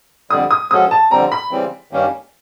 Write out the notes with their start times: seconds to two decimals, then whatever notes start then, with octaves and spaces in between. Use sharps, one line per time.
0.30 F2 D3 G3 D#6
0.51 D#6
0.71 F3 G#3 C#4 F#4 A4 D#6
0.91 A5
1.11 F2 D3 G3 C4 A#5
1.32 B5
1.51 C#3 E3 G3 C4
1.91 G2 D#3 G3 A#3 C#4